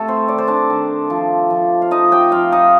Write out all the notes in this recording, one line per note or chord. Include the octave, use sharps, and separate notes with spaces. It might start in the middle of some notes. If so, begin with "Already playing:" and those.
Already playing: C3 A3 A4
C4 C5
D#3 D5
C5
D4 D5
D#3
F3
F3
F5
F3 D#4 D#5
G4 G5
F3 F4 F5
D#4 D#5